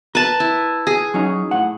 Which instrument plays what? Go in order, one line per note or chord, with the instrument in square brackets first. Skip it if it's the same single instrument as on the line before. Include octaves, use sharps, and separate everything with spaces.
[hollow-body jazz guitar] A#4 [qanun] B4 A5
[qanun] E4
G#4
[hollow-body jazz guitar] F#3 C#4 D#4
A2 F#5